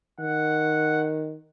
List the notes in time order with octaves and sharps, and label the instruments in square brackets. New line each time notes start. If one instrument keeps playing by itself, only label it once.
[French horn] D#3 [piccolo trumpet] F#5